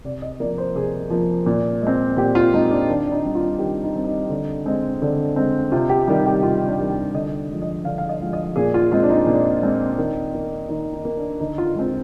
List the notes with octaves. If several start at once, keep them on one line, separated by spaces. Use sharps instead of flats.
C3 D5
D#5
F3 A#3 D5
C5
C3 G#4
F3 A#3
A#2
G#3
C4
A#2 G4
F4
G#3 C4 D#4
D4
D#3 D4
D#4
G3 C4
F4
D#3 G4
D#4
G3 C4
D#4
D3
G#3 C4
D3
G#3 C4
C3 F4
G4
D#3 G3
G4
C3 F4
D4
D#3 G3
G4
D3 D#5
F3 G#3
D#5
D3 F5
F5
D#5
F3 G#3
D#5
A#2 G#4
F4
G#3 C4 F4
D4
D#4
A#2
G#3 C4
D#3
A#3
D#3 D#4
D#4
A#3
D4
D3 D#4
F4
G#3 C4 F4